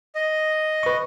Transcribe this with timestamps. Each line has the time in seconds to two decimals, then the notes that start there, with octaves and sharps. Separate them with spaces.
0.15 D#5
0.83 B4 C#6